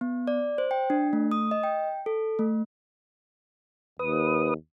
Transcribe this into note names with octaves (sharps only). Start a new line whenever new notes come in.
B3
D5
C5
G5
D4
A3
D#6
D#5
G5
A4
A3
D#2 B4 D#6